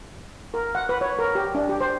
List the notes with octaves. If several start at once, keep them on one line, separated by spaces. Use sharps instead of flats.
A#4
F#5
B4
C#5
A#4
G4
D4
G4
C5